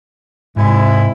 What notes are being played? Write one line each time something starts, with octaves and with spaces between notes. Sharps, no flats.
G#2 C3 G#3 C4 E4